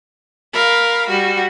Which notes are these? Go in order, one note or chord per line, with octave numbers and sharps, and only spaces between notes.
A#4 F5 B5
G3 F#4